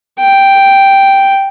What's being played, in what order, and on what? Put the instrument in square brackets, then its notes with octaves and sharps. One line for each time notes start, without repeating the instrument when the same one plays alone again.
[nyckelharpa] G5